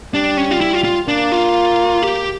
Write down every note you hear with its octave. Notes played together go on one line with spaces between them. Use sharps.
G3 D4
C#4
F4
E4
F4
F4
A#3 D4
F4
G4